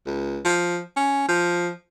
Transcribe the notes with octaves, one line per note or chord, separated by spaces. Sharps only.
C#2
F3
C#4
F3